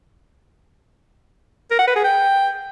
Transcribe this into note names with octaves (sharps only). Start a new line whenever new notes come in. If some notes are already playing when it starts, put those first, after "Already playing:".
A#4
F#5
B4
G#4
G5